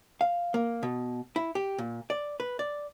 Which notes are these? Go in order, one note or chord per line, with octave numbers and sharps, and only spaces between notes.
F5
A#3
B2
E4
G4
A#2
D5
B4
D5